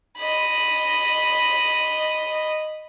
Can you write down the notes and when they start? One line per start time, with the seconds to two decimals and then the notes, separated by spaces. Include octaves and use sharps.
0.18 D#5 B5